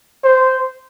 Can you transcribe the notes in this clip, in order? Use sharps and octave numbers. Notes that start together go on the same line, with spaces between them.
C5